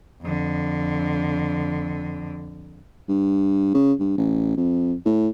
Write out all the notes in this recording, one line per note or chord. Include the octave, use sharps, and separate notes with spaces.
F2 D3
G2
C#3
G2
A1
F2
A2